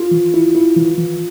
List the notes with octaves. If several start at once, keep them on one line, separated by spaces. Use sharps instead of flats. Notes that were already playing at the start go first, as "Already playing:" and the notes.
Already playing: F4
E3
E4
E4
E3
E3